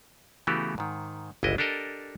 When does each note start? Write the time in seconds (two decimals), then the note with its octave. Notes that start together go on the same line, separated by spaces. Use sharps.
0.47 C#3 E3 A3 B3 F#4 G4
0.78 G#2 D#3
1.43 G1 C#2 D4 E4 D#5
1.58 D4 G4 A4 A#4 D#5